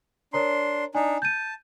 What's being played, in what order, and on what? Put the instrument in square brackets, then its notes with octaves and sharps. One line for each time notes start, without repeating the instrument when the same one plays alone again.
[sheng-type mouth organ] D4 C6 [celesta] A#4 C#5 A#5
[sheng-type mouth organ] D4 D#4 [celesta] G#5
[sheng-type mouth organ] A5 [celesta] G6 D#7